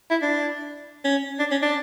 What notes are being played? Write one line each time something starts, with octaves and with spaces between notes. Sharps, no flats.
E4
D4
C#4
D4
C#4
D4